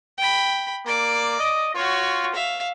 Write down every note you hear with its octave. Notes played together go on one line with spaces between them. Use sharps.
G5 B5
A#3 D5 D6
D#5
F4 F#4 C#5
E5 F5